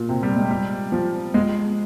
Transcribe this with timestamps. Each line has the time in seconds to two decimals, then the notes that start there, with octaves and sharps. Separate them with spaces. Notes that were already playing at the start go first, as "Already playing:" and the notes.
Already playing: A#2
0.09 C3
0.23 G3
0.36 G#3
0.51 G3
0.92 F3
1.34 G#3